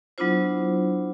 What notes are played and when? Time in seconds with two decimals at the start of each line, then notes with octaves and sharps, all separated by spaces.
0.18 F#3 B3 D4 E4 F4 C5